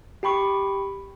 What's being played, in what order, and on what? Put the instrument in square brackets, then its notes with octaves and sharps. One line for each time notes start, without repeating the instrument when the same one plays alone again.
[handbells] G4 G5 B5 C#6